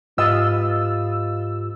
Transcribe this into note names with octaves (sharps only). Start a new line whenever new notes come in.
G#2 F4 G4 B4 D#5 E6 A6